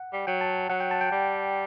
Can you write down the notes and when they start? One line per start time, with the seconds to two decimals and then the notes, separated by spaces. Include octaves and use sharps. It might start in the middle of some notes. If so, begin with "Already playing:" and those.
Already playing: F#5
0.13 G3
0.27 F#3 G5
0.41 A5
0.69 F#3 F#5
0.80 G5
0.91 A5
1.01 G5
1.12 G3